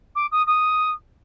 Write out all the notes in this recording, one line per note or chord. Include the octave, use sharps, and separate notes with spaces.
D6
D#6
D#6